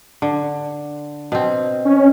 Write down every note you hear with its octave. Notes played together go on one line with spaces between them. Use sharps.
D3
B2 C4
C#4